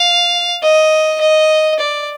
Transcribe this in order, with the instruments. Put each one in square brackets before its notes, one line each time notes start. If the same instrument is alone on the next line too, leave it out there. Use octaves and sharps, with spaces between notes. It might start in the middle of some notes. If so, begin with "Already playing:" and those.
Already playing: [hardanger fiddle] F5
D#5
D#5
D5